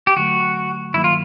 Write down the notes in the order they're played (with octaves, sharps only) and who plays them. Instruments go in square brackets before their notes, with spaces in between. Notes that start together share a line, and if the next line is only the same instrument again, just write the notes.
[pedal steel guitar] G4
[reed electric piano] D3 F#3 A3 [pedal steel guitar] F#4
[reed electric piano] G2 D#3 F#3 A#3 [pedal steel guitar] E4
[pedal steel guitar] F4